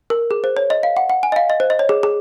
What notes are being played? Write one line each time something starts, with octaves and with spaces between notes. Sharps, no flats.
A#4
G#4
C5
C#5
D#5
F5
F#5
F#5
G#5
D#5
F5
D#5
C5
D#5
C#5
G#4
G#4